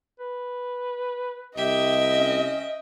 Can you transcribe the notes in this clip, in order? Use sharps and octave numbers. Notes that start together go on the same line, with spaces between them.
B4
C2 G4 D#5 E5 G5
C#4